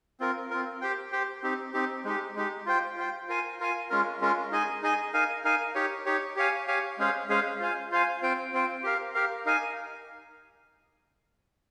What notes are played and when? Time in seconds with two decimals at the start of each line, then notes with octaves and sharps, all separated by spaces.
0.20 C4 F4 A#4
0.50 C4 F4 A#4
0.81 G4 C5 G5
1.12 G4 C5 G5
1.43 C4 D#4 G4
1.74 C4 D#4 G4
2.05 G#3 D#4 G4
2.36 G#3 D#4 G4
2.66 F4 C5 G5
2.97 F4 C5 G5
3.28 F4 A#4 F5 G#5
3.60 F4 A#4 F5 G#5
3.90 G#3 C#4 F4 A#4
4.21 G#3 C#4 F4 A#4
4.51 D#4 G#4 D#5 G#5
4.82 D#4 G#4 D#5 G#5
5.13 D#4 A#4 F5 G#5
5.44 D#4 A#4 F5 G#5
5.75 D#4 G4 C#5
6.06 D#4 G4 C#5
6.36 G4 C#5 F5 G#5
6.68 G4 C#5 F5 G#5
6.98 G#3 C#4 G#4 C5 F5
7.29 G#3 C#4 G#4 C5 F5
7.60 F4 C5 F5 G#5
7.91 F4 C5 F5 G#5
8.22 C4 F4 C5 G5
8.53 C4 F4 C5 G5
8.83 G4 A#4 F5
9.14 G4 A#4 F5
9.46 D#4 A#4 F5 G#5